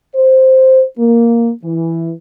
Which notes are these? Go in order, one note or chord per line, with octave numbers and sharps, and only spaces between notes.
C5
A#3
E3